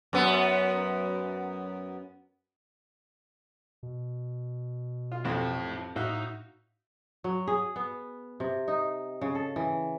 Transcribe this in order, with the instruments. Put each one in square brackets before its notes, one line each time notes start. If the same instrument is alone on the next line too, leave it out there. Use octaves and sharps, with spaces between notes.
[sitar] F#2 B3
[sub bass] B2
[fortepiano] F4
[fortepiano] A1 F2 C3 [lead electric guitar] E4 A5
[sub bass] A2 [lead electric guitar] D#4 [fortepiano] F#4 E5 F5
[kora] F#3
G#4
B3
C3
D#4
C#3
A4
E3